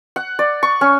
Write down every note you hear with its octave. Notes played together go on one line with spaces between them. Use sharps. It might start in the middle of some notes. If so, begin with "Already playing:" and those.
F#5
D5
C#6
C#4